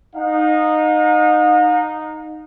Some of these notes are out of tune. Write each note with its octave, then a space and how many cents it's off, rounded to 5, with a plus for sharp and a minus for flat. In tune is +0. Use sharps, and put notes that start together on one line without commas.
D#4 -10 F5 +45